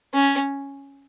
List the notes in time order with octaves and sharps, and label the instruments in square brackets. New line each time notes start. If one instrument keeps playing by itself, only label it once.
[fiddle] C#4